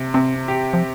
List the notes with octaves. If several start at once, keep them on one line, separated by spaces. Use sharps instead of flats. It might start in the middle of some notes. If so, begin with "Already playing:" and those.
Already playing: C3
C3 C4
G4
F3